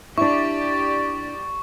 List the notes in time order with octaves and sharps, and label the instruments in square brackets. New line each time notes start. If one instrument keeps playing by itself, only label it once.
[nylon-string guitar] D4 E4 [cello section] G4 D5 [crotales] C#6